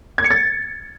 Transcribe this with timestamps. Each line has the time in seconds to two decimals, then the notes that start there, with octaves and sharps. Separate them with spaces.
0.18 G#6
0.24 C#7
0.31 A6